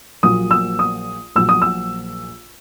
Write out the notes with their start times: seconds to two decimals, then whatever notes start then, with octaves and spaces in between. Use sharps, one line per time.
0.23 A#1 A#2 F#3 D#6
0.51 E6
0.79 D#6
1.36 A#1 A#2 F#3 E6
1.49 D#6
1.62 E6